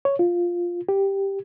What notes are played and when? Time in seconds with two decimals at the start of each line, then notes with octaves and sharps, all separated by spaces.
0.05 C#5
0.19 F4
0.89 G4